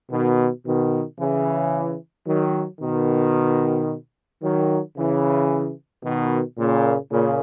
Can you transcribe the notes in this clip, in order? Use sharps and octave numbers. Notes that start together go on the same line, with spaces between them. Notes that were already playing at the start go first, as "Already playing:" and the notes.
B2 D#3
B2 D#3
C#3 E3
D#3 F#3
B2 D#3
D#3 F#3
C#3 E3
B2 D#3
A#2 C#3
A#2 C#3